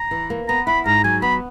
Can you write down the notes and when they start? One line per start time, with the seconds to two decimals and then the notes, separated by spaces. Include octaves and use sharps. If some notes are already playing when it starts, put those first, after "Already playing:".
Already playing: A#5
0.11 E3
0.30 A#3
0.48 B3 A#5
0.67 E4 B5
0.86 G#2 A#5
1.04 F#3 G#5
1.22 B3 B5